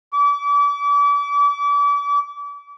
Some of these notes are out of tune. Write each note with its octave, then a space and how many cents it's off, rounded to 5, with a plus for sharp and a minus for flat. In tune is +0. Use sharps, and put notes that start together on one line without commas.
D6 -35